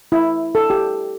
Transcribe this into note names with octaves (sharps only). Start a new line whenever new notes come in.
E4
A4
G4